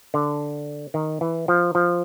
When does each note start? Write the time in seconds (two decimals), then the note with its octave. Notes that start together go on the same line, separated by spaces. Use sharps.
0.14 D3
0.94 D#3
1.21 E3
1.48 F3
1.75 F3